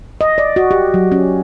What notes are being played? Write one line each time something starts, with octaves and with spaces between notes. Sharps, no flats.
D#5
D5
F#4
G4
F#3
C#4